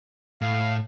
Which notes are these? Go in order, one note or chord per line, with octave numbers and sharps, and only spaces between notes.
A2 F5